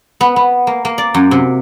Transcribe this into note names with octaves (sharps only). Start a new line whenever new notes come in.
B3
B3
A#3
A#3
D5
F#2
C3